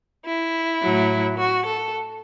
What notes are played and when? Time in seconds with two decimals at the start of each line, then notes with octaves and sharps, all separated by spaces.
0.25 E4
0.81 A2 F#3
1.38 F#4
1.65 A4